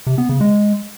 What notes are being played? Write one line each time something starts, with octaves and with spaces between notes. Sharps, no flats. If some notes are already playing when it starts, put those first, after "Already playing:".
C3
B3
C#3
G#3